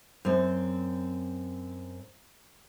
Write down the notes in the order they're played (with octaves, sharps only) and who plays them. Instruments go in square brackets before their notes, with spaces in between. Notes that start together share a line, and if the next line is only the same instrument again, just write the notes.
[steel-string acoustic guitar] F#2 C4